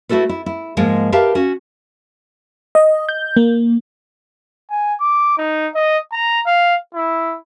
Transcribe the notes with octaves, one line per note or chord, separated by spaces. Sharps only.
A3 E4 F#4 A4 B4
E4
E4
G#2 F3 G#3 A#3
G4 A#4 B4 E5 F5 A5
C#4 F#4
D#5
G6
A#3
G#5
D6
D#4
D#5
A#5
F5
E4